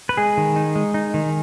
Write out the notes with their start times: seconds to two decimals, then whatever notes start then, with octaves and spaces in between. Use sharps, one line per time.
0.09 B4
0.17 G#3 G#4
0.37 D#3
0.56 D#4
0.75 G#3
0.94 D#4
1.14 D#3